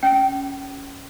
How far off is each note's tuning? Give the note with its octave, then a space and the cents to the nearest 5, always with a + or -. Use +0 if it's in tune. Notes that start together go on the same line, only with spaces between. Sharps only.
C#4 +0 G5 -15